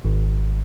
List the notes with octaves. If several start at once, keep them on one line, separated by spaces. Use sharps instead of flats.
G#1